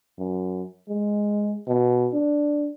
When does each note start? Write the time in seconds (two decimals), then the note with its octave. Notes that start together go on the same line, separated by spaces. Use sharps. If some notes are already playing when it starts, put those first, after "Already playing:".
0.18 F#2
0.89 G#3
1.67 B2
2.13 D4